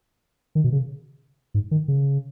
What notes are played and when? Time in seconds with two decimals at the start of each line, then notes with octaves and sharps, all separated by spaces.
0.55 D#3
0.64 B2
0.72 C#3
1.54 G#2
1.71 D#3
1.88 C#3